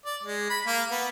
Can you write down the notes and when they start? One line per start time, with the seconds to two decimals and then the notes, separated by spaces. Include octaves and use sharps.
0.05 D5
0.23 G#3
0.50 B5
0.67 A#3
0.91 B3